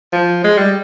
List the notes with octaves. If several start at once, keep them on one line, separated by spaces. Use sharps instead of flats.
F3
G#3
G3